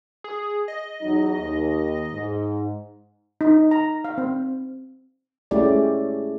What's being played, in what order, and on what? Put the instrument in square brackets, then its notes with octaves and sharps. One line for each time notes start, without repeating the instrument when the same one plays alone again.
[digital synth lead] G#4
D#5
[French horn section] E2 F#3 D#4
D#2
G#2
[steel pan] D#4
A#5
F5
C4
[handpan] G#3 A3 C#4 E4 G4 D5